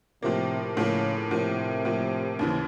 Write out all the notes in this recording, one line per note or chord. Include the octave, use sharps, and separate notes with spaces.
A2 C3 F3 A#3
A2 C#3 F3 A#3
A2 C3 F3 A#3
A2 F3 A#3
D#2 C#3 E3